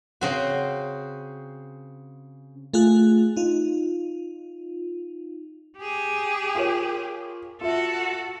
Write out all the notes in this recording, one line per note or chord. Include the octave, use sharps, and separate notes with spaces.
C#3 C4 F#4
A3 F4 G#4 F#6
D#4 F4
G4 G#4
F4 A#4 C#5
F4 F#4 A4 E5